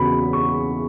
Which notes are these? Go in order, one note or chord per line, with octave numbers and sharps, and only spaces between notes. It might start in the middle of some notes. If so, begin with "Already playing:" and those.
Already playing: E2 C#3 F#3 B5
C#6